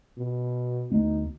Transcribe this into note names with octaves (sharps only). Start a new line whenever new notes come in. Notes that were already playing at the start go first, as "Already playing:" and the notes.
B2
D2 A3 B3 D#4